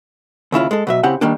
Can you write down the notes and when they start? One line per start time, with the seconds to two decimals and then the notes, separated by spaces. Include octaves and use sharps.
0.52 D#2 C#3 E4 F4
0.71 G#3 A4
0.87 B2 F#3 E5
1.03 C#3 C4 E4 G4 F#5
1.21 D#3 G3 A#3 D4